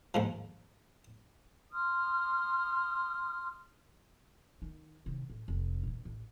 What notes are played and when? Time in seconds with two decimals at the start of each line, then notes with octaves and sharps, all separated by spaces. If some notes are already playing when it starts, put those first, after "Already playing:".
0.14 D#2 G#2 F3
1.72 C6 D#6 F6
4.62 D#3 D#4
5.06 C3 D#3
5.30 A2
5.48 F1
5.83 A#2 D3
6.05 A1